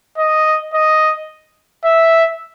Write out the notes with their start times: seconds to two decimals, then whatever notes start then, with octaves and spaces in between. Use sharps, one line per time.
0.18 D#5
0.74 D#5
1.85 E5